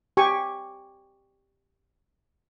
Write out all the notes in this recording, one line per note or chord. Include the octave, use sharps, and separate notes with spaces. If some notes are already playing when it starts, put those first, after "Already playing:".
G4 G#5 C#6